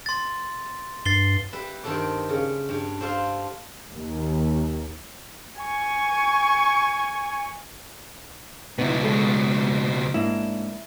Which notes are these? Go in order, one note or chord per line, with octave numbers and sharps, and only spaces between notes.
C6 A6
G2 A6 C7 G7
G3 B4 E5
G2 D#3 C4 D4 A4 D5
C#3
G2 D4
D4 F4 A4 C5
D#2
G#5 C#6
C#2 B2 B3 D#4 E4
G#2 A4
G#2 A#3 D4 E4